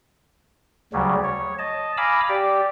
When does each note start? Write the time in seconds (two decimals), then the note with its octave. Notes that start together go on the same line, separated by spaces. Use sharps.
0.93 D2 C#3 F#3 G3
1.24 C#5
1.59 D#5 A5
1.97 F5 G#5 A#5 B5 D6 E6
2.29 G4 D5